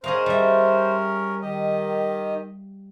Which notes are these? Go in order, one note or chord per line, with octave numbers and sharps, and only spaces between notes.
C#4 G#4 A#4 C5 D#5 F5
G3 E5
D#3 G4 D#5